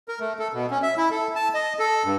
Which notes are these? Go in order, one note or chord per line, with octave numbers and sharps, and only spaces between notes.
A#4
A3
A4
B2
C#4
E5
E4
A4
A5
D#5
A4
G2